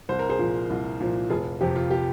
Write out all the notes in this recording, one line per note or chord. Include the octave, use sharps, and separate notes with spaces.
C2 C5
A#4
G#4 C5
A#2 F3
C2
A#2 F3
F1 F4 G#4
F2 C3 G4
F4
G4